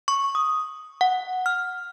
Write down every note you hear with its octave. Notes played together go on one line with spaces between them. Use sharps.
C#6
D#6
F#5
F6